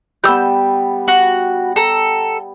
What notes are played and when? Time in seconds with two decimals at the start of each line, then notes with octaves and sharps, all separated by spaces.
0.24 G3 B3 E6 G6
1.08 F#4
1.76 A4 A#5